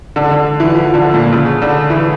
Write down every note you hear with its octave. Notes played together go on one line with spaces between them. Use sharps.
D3
D3
E3
F3
D3
A#2
C#3
D3
E3